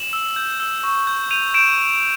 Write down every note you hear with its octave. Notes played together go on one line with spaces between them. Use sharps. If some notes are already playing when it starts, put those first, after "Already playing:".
Already playing: E7 F#7
E6
G6
E6
C#6
G6
G6 D#7 F7
G6 D7 E7